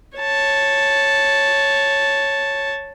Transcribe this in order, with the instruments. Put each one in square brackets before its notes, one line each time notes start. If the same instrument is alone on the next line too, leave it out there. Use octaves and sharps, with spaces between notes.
[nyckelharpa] C#5 A5